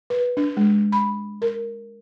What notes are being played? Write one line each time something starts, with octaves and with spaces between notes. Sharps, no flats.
B4
D4
G#3
B5
A#4